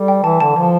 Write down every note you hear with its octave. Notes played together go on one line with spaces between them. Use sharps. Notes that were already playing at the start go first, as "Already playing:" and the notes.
Already playing: G3 A4
G5
E3 A5
D3 A5
F3 A5